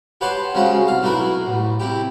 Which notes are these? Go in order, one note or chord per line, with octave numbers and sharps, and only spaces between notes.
G4 B4 C#5 F#5 A5 C6
C#3 F3 G#3 C#4 F#4 G#4
C2 F5
B1 A3 E4 F#4 A#4 B4
A1
C3 E4 G4